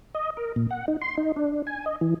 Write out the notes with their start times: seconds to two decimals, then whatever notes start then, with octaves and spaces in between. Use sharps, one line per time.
0.15 D#5
0.37 A#4
0.56 A#2
0.71 F#5
0.88 D#4
1.01 C6
1.17 D#4
1.36 D4
1.67 G#5
1.86 D#5
2.01 E3